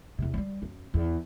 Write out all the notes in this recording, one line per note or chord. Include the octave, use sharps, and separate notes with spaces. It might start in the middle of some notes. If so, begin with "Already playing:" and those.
E2 C3
F#3 G3
F#2
E2